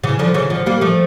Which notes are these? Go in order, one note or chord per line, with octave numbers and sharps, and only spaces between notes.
C#3 E3
D3 F3
C#3 E3
D3 F3
G3 A#3
F3 A3